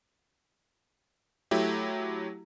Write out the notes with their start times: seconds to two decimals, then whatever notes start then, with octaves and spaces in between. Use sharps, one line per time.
1.51 F#3 A3 E4 G4